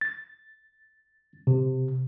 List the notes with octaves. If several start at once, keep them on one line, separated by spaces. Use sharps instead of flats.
A6
C3